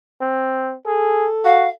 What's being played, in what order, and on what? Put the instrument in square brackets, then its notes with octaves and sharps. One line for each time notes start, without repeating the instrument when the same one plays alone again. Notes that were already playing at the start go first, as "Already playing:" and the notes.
[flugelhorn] C4
[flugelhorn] G#4 [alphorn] A4
[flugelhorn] F#4 [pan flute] F5